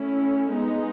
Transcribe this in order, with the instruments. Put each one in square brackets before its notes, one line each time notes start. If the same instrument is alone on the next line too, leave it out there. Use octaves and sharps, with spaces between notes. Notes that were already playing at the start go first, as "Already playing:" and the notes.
Already playing: [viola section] A3 C#4 E4
G#3 B3 D#4